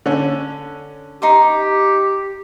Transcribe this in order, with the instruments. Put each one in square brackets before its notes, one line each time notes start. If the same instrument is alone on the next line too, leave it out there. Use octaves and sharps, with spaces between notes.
[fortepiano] D3 C#4
[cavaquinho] D#4 C6 D6 [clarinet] G4